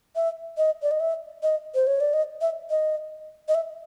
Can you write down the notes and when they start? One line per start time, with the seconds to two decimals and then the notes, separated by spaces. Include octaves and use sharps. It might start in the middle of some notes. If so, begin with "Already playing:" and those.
0.16 E5
0.58 D#5
0.83 D5
0.91 D#5
1.00 E5
1.43 D#5
1.75 C5
1.87 C#5
2.00 D5
2.13 D#5
2.41 E5
2.70 D#5
3.48 D#5
3.55 E5